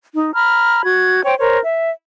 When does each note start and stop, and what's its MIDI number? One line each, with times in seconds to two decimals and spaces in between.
0.15 0.34 63
0.34 0.82 82
0.34 0.82 83
0.34 0.82 89
0.85 1.23 66
0.85 1.23 92
1.25 1.35 72
1.25 1.35 73
1.25 1.35 79
1.38 1.59 70
1.38 1.59 72
1.38 1.59 73
1.64 1.90 76